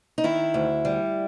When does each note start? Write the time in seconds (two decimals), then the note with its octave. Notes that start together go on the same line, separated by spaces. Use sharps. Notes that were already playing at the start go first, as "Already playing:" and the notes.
0.18 D#4
0.24 D#3 E4
0.54 D2
0.85 G3